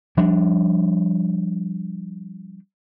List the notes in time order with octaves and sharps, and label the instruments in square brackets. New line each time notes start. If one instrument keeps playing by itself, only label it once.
[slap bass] F3 G3 D4